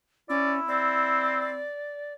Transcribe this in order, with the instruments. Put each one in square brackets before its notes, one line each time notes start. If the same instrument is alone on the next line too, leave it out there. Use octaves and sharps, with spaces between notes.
[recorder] C#4 [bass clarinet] E4 [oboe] D5
[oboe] C4 [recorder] D5